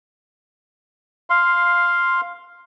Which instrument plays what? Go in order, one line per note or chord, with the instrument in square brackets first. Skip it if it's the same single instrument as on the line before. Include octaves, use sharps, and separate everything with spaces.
[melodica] F5 C6